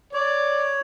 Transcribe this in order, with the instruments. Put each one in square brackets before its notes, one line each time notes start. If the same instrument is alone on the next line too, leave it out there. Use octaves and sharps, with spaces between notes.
[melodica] C#5 [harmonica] D5